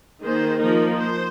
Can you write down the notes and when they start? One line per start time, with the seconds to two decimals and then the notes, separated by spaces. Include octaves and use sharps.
0.21 D#3 A#3 G#4 C5
0.59 F3 A#3 D#4 A#4
0.99 C5